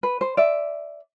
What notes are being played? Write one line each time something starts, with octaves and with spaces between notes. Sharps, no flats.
B4
C5
D5 E5